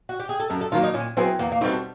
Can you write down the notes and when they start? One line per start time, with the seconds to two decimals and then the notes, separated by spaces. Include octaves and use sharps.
0.09 F#4
0.20 G4
0.29 G#4
0.40 A4
0.50 F#2 A#4
0.61 A4
0.72 D#3 F#3 A#3 F4
0.83 D#4
0.94 A#2 C#4
1.17 F#3 B3 C4 E4 G#4
1.39 E2 A#3
1.52 A#3
1.61 B2 G3 A3 C4 D#4